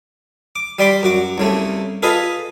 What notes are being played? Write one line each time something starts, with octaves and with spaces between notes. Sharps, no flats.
D6
G3 D5 G5 B5 C6 D6
F#2 F#4 D6
C2 C#3 A3
F4 G#4 A4 B4 D#5 B5